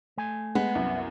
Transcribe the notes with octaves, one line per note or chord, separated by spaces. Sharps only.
A3 G#5
G#3 B3
C2 F#2